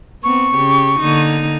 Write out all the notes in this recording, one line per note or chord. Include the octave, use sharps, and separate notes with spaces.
B3 C4 C#6
C#3 G4
D3 A#3 D#4